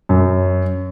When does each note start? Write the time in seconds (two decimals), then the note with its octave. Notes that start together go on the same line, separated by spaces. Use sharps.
0.09 F#2